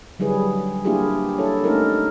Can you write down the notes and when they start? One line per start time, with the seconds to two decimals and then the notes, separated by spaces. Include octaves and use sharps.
0.19 D3 F#3 G3 E4 G#4 B4
0.85 A#3 D4 E4 F4 G4 G#4
1.38 D4 E4 A4 C#5
1.64 A3 C#4 D#4 F4 A4 A#4